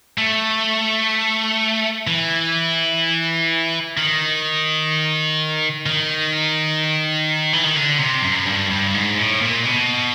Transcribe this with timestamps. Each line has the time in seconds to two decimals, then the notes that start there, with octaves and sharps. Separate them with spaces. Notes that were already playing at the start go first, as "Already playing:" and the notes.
0.18 A3
2.07 E3
3.97 D#3
5.86 D#3
7.53 E3
7.64 D#3
7.76 D3
7.99 C3
8.23 F#2
8.46 G2
8.71 G2
8.94 G#2
9.17 A2
9.41 A#2
9.65 B2